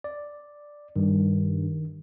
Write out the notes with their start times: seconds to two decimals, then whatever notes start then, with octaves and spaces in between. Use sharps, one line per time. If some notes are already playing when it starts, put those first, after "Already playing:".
0.04 D5
0.96 G2 D#3